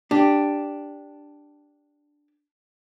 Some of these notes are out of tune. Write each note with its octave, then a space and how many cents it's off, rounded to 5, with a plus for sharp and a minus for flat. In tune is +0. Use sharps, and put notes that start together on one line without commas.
D4 +0 G4 +0